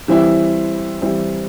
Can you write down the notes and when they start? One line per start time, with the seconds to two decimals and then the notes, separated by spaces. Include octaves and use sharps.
0.08 E3 G3 C4 E4
1.02 E3 G3 C4 E4